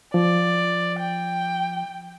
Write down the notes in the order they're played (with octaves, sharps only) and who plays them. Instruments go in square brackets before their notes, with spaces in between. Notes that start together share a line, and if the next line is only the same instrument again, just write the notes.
[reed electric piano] F3 [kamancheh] D5
[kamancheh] G5